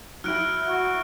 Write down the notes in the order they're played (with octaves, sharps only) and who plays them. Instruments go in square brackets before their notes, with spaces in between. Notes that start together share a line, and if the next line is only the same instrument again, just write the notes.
[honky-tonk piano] F#3 E4 [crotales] F6 F#6 D7
[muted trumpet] F#4